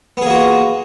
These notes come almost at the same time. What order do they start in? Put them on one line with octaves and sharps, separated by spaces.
B3 G#4 A#3 F#4 F4